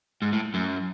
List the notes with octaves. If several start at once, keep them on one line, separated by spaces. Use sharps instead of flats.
G#2
A2
F#2